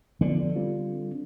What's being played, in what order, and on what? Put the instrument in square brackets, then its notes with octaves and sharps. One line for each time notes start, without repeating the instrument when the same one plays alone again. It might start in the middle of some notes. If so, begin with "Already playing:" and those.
[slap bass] D3 [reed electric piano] F3 B3
[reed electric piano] G3 C4 F4